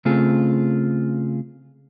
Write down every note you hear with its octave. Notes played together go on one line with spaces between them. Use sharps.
C#3 A3 C4 F4 G#4